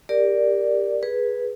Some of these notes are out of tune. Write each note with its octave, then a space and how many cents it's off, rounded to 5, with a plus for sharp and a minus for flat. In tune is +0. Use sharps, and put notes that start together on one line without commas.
G4 +20 A#4 +0 D5 +0
G#4 +0 B4 -10